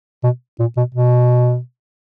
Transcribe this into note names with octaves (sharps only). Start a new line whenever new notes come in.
B2
A#2
B2
B2